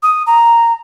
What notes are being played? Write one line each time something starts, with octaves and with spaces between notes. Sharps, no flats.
D#6
A#5